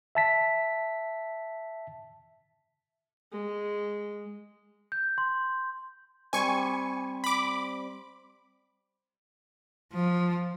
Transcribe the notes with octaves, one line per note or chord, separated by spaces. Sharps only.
E5 A5 B6
G#3
G6
C6
G3 C4 G#5 C#6
B5 D6
F3